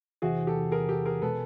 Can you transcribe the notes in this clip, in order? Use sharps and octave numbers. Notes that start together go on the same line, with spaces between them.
E2 C3 E3 F#4 G#4
G4 A4
G#4 A#4
G4 A4
G#4 A#4
B2 G#3 A4 B4